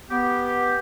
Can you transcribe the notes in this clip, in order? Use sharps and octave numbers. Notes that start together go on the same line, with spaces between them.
B3 G4